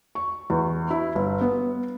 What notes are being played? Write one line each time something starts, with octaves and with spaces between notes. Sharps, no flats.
C#6
E2
E4
G1
B3